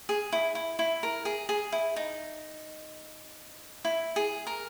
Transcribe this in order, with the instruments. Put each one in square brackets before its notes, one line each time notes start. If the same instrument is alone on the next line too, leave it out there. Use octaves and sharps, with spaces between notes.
[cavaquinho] G#4
E4
E4
E4
A#4
G#4
G#4
E4
D#4
E4
G#4
A#4